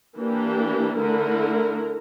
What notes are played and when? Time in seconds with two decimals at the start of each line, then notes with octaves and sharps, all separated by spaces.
0.18 E3 A#3 D4 G4
0.98 D3 A3 E4 A#4